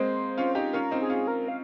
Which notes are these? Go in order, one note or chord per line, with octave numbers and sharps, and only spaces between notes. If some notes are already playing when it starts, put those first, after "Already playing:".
Already playing: G#3 A#3 C4 C5
C#4 F4
D#4 G4
C#4 F4 A#4
C4 D#4
G#4
C#4 F4
A#4
F5